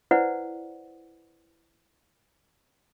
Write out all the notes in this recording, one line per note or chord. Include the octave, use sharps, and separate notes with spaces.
E4 B4 C5 D5 F#5